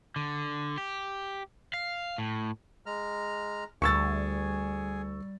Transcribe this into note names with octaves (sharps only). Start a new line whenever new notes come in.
D3
G4
F5
A2
G#3 A#5 F6
D2 G3 G#4 G#5 C#6 E6 A6